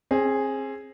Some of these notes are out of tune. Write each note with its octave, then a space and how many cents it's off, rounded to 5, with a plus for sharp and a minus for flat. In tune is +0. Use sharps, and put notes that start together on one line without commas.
C4 +35 G#4 +0